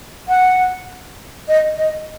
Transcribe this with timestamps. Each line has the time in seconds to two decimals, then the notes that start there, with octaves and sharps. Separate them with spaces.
0.28 F#5
1.48 D#5
1.77 D#5